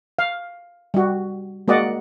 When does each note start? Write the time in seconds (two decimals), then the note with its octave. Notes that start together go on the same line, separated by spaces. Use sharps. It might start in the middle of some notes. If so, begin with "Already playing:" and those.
0.19 F5
0.94 G3 F#4
1.68 G#3 A#3 F#4 D5 D#5 F#5